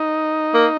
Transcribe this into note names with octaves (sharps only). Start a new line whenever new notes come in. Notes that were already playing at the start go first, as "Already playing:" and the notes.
Already playing: D#4
A#3